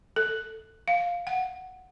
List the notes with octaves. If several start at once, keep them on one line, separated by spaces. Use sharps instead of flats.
A4
F5
F#5